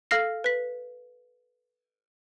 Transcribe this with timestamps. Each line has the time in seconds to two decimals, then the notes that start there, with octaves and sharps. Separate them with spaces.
0.11 A4 F5 F6 A#6 C7
0.44 B4 B6